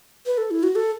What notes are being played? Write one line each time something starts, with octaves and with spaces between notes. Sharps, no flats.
B4
A4
E4
F#4
A4